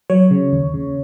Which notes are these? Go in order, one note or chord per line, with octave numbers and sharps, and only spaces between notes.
F#3 C#5
C#3
D#2
C#3